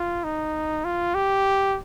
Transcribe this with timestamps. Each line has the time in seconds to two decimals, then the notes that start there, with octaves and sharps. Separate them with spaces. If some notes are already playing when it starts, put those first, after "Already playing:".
Already playing: F4
0.24 D#4
0.85 F4
1.15 G4